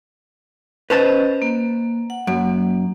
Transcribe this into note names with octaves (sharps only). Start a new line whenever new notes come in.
C#4 B4 C5 D#5 A5
A#3
F#5
F#2 A#3